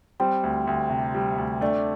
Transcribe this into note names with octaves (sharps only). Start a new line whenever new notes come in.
G3 C4
D2
D2
C3
G3
D2
A3 D4